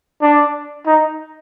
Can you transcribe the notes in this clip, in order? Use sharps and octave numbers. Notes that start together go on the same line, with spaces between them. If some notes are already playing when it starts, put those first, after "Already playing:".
D4
D#4